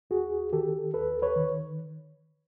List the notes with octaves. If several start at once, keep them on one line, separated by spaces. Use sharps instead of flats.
D#2 F#4 G#4
D#3 G4 A4
D#2 A4 B4
B4 C#5
D#3